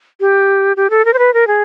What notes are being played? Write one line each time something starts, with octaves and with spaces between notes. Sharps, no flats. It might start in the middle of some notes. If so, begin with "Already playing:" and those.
G4
G4
A4
A#4
C5
B4
A#4
G#4